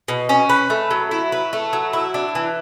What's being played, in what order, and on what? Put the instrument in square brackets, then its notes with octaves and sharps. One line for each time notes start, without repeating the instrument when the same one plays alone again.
[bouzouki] B2
C#4
B4
A3
F#3
E4
B4
A3
F#3
E4
D4
E3